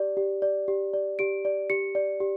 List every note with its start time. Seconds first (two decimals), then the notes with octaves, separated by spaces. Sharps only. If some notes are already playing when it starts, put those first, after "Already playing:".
Already playing: G4 D5
0.17 G4
0.42 D5
0.68 G4
0.93 D5
1.19 G4 D7
1.45 D5
1.70 G4 C#7
1.95 D5
2.20 G4